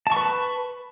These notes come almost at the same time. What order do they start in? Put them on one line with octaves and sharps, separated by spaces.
A5 C#6 B4